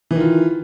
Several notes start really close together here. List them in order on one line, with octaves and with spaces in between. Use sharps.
E3 D#3 F4